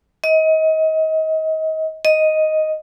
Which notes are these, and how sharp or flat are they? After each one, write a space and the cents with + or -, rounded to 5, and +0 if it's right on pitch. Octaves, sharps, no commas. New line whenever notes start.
D#5 +30
D#5 +5